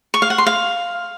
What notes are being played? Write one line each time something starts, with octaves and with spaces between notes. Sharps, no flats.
C#6
F5
F#5
C6
F5